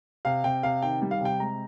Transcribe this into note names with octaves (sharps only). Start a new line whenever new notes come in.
C3 F5
C3 G5
C3 F5
D#3 G5
G3
F5
C3 G5
G#3 A#5